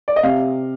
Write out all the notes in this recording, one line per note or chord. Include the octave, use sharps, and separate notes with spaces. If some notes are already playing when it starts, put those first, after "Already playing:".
D5
D#5
C3 F5